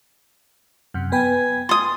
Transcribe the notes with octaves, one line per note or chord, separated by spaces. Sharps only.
F#2 C3
B3 B4 G5 G#5
C6 D#6 A6